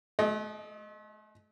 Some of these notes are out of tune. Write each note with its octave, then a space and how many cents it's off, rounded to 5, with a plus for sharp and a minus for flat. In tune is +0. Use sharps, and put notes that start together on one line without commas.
A3 -45 D#5 -5